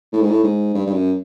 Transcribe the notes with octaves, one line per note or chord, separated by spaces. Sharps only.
A2
G#2
A2
G#2
G2
G2
F#2